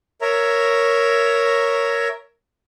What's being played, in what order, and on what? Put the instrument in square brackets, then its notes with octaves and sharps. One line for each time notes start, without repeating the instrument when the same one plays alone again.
[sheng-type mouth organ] A#4 C#5 E5 A#5